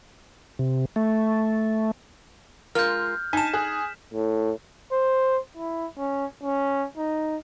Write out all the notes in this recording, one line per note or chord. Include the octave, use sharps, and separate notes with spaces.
C3
A3
G#3 F4 A#4 F6 G6
D#4 G#5 A5 B6 E7
G#4 F#6
A2
C5
E4
C#4
C#4
D#4